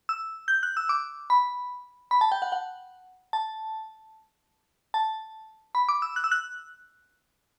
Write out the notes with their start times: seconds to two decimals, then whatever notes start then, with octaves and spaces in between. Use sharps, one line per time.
0.09 E6
0.48 G6
0.63 F#6
0.77 E6
0.89 D6
1.30 B5
2.11 B5
2.21 A5
2.32 G5
2.42 F#5
2.52 F#5
3.33 A5
4.94 A5
5.75 B5
5.89 D6
6.02 E6
6.16 F#6
6.24 E6
6.32 F#6